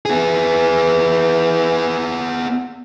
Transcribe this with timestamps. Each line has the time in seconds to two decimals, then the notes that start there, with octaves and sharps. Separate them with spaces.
0.06 B3 G#4